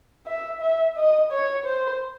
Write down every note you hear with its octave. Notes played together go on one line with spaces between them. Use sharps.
E5
E5
D#5
C#5
C5